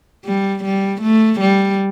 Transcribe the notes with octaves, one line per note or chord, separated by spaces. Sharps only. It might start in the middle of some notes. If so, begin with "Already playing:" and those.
G3
G3
A3
G3